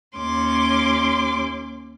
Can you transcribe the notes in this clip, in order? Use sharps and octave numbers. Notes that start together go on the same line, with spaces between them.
D#2 C#4 C6 D6